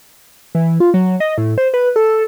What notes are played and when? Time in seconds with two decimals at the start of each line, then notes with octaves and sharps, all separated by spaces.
0.55 E3
0.80 F4
0.94 F#3
1.20 D#5
1.38 A2
1.58 C5
1.74 B4
1.96 A4